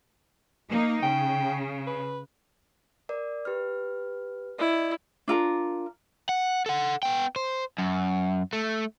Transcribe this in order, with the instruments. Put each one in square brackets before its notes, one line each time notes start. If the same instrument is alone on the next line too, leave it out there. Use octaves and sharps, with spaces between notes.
[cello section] A#3 D#4
[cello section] C#3 [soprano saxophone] G5
[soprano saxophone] B4
[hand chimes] A#4 D5
G4 B4 F6
[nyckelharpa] E4 [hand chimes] D5 D#5
[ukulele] D4 F4 A#4
[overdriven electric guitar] F#5
A4 F#5
B3 G5
C5
F#2
A3